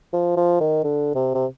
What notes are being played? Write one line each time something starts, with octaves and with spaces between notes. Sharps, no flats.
F3
F3
D#3
D3
C3
C3